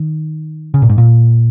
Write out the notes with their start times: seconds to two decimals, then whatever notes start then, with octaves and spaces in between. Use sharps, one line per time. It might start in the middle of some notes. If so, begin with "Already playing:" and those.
Already playing: D#3
0.74 C#3
0.82 A#2
0.89 G#2
0.98 A#2